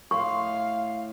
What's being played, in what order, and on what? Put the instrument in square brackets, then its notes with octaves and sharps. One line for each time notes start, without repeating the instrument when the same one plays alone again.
[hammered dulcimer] A2 C6 [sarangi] F5 [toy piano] C#6